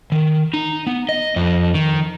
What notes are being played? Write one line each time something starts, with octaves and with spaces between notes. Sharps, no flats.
D#3
D#4
B3
D#5
F2
D#3